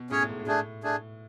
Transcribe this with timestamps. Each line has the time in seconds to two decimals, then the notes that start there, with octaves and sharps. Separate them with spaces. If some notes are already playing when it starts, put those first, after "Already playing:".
Already playing: B2
0.10 A2 C#4 G#4 C#5
0.23 A2
0.29 G#2
0.40 G#2
0.46 A2 A3 D4 G#4
0.84 A3 D4 G#4